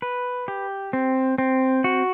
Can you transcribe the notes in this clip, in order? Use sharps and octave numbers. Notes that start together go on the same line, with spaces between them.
B4
G4
C4
C4
F#4